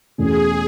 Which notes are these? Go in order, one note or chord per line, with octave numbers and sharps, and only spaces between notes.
E2 B2 A3 C#4 G#4